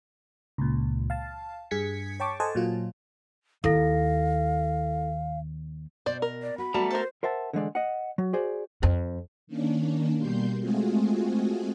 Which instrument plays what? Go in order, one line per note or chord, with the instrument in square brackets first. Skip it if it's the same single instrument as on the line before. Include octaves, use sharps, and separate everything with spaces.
[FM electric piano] C#2 A#2
F5 A5
G2 G#4 G#6 B6 C#7
C#5 G5 A5 C#6 D6
A4 C5 D#5 F#5 G#5 A5
A#2 F#3 F4
[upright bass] D#2 [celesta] E4 A4 A#6 [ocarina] F5
[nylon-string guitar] B2 [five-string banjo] C5 D5
[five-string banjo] A#4
[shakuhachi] D5
[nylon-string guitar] F#4 [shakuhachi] B5
[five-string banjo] G3 [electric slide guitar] A3 A5 A#5 [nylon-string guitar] B3 F#4
[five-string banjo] A4 A#4 [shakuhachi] C5
[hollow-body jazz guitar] A#4 C5 E5 F#5 A5
D3 E3 G#3 D5
D#5 F#5
F#3
F#4 G#4 C5 D5
[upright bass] F2
[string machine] D#3 A#3 C#4 D4
B2 G3 A#3 C6 G6
G#3 A3 C4 F4 F#4 G#4